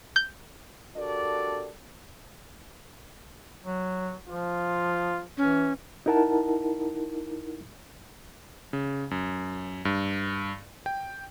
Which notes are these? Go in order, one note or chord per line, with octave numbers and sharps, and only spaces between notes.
G6
D4 F#4 G4 A4 A#4 D5
F#3
F3 F4
E3 C#4
D#4 E4 A#4 F#5 A5
C#3
F#2
G2
G5